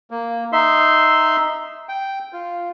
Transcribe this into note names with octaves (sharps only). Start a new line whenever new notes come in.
A#3
D#4 E5 C6
G5
F4